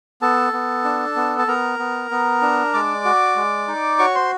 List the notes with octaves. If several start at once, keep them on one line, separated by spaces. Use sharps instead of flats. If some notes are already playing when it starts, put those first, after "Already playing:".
B3 A4 A5
B3
D4
B3
A5
B3 A#4 A#5
B3
B3
D4
G#3 D5 D6
F#4
G#3
D#4
F#4 C#5 C#6
C5 C6